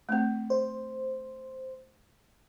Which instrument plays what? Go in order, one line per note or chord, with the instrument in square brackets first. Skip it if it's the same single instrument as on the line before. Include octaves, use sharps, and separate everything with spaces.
[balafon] A3 C4
[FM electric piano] C5